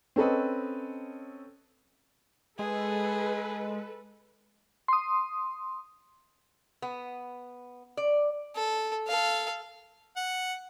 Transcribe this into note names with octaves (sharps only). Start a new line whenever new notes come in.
C4 C#4 A4 B4 D#5
G#3 G#4 A4 B4
C6 D#6
B3
D5
A4
A4 F5
F#5